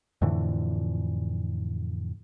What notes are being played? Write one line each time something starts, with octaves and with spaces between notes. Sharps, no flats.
F2 A2 D3 E3